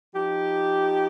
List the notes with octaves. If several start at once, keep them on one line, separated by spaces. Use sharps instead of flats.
F3 D#4 G4